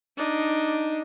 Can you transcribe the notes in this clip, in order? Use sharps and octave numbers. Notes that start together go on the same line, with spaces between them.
D4 D#4